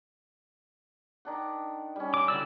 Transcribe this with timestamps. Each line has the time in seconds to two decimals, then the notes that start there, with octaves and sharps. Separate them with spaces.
1.25 D#3 D4 F#5
1.96 G3 C#4
2.14 D6
2.28 D3 E4 F#4 D5 E6